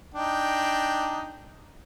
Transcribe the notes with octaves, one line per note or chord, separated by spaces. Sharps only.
D4 D#4 G5